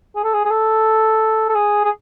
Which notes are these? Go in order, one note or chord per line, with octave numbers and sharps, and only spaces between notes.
G#4
A4
G#4
G#4
A4
A4
G#4
G#4